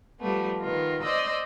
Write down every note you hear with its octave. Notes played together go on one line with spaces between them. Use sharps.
F3 G3 A3 B3
D#3 B3 F4
C5 D5 D#5 E6